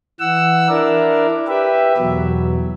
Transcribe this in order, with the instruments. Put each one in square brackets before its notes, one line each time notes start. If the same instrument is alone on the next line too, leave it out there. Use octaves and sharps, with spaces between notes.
[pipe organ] E3 F#5 E6
D4 E4 A#4 D5
G4 B4 E5
E2 B2 F#3